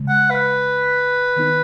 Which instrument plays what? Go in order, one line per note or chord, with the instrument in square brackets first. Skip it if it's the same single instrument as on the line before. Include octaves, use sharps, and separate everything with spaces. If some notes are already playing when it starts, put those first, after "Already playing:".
Already playing: [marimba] C#3 G#3
[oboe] F#5
B4
[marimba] D#3 B3 D#4